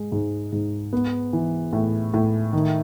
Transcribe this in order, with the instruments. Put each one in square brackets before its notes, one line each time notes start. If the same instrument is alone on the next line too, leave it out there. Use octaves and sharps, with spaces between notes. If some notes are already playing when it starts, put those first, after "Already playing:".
Already playing: [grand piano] G#2 G#3
G#2
G#2
B3
E3
A2
A2
D#3